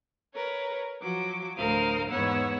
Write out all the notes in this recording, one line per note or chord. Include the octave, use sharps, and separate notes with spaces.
A#4 B4 C#5
F3 F#3 F#4 D6
D2 A2 A#4 C5 F5 D#6
E2 G#2 B3 C#5 F#5 E6